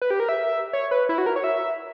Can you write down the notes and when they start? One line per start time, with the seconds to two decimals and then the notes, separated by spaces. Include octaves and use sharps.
0.02 B4
0.11 G4
0.20 A#4
0.29 E5
0.73 C#5
0.91 B4
1.09 E4
1.18 F#4
1.26 A#4
1.36 C#5
1.44 E5